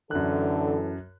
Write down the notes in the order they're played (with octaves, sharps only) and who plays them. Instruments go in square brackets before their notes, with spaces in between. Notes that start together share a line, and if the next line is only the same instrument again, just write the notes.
[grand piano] F#2 F#6 [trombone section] A2 E3 A4 [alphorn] D3